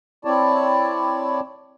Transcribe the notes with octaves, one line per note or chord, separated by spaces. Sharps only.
C4 E4 C#5 D5 A5